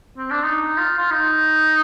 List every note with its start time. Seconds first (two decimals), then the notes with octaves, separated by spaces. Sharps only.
0.17 C4
0.31 D4
0.44 D#4
0.77 F4
0.98 F4
1.11 D#4